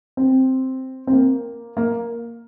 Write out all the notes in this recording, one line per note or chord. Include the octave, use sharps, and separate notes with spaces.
C4
C4
A#3
A#3